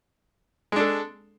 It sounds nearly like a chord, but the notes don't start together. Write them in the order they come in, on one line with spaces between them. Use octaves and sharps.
G#3 D4 A4